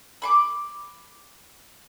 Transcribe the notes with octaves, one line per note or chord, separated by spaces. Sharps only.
B5 C6 D6